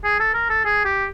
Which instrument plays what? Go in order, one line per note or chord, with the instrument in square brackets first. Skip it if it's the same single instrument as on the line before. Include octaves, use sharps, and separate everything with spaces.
[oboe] G#4
A4
A#4
A4
G#4
G4